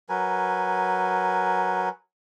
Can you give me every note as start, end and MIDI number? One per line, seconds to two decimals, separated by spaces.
0.09 1.89 54
0.09 1.89 70
0.09 1.89 71
0.09 1.89 80